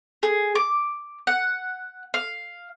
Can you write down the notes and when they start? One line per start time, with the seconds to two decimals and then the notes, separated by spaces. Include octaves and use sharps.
0.23 G#4
0.55 D6
1.27 F#5
2.14 F5